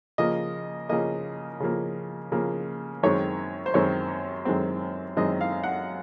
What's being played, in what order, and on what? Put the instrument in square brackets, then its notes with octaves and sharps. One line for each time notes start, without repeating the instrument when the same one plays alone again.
[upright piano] C#3 F3 A#3 D#5
C#3 F3 A#3 D#5
C#3 F3 A#3
C#3 F3 A#3
F#2 D#3 G#3 C4 C#5
C5
F#2 D#3 G#3 C4 C#5
F#2 D#3 G#3 C4
F#2 D#3 G#3 C4 D#5
F5
F#5